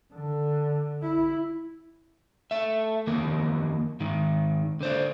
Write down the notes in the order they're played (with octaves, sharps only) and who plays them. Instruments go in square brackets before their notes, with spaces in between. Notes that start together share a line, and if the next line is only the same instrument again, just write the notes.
[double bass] D3
E4
[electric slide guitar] A3 E5
F2 D#3 A#3 A#4
G#2 D#3
D3 C5 D5